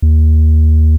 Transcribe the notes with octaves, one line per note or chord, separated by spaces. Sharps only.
D#2